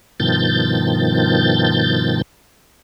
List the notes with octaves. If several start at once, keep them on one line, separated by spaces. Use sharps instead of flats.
G2 B2 D#3 F3 G6 A6